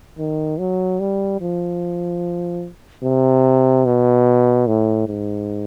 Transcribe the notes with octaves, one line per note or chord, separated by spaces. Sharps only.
D#3
F#3
G3
F3
C3
B2
A2
G#2